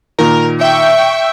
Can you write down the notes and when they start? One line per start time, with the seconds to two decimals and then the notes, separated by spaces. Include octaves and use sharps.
0.19 A#2 D#3 A#4
0.61 E5 G5 C#6